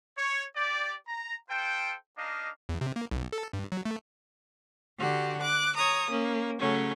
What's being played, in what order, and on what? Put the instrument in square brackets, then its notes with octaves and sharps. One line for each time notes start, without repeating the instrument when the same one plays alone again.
[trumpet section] C#5
G4 D5
A#5
F4 A4 C5 G5
A#3 D4 D#4 D#5 F5
[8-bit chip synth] E2
C3
A#3
B1
A4
G2
F#3
A3
[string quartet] D3 F#4 G4
D6 F#6
C#5 A#5 D#6
A#3 C#4
C#3 F#3 A3 C#4